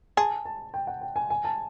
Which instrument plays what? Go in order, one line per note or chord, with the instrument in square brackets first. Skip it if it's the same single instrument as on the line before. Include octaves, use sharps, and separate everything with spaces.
[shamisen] G#4 [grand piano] A5
[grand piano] A5
G5
F#5
G5
G#5
G#5
A5